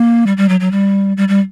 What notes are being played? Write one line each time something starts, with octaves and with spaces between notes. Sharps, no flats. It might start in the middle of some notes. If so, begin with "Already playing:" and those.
Already playing: A#3
G3
G3
F#3
F#3
G3
G3
G3